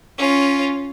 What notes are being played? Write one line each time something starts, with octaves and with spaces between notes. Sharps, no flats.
C#4 F4